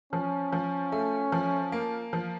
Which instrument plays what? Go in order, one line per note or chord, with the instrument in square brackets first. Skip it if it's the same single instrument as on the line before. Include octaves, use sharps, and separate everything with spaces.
[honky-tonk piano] F3 [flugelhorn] C#4
[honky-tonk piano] F3
A3
F3
A#3
F3